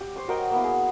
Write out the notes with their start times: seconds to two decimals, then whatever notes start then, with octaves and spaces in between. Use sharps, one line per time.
0.01 G4
0.16 C5 C#6 D6
0.28 F#4 A#4 D#5 G5
0.51 A#3 B3 E4
0.64 G#4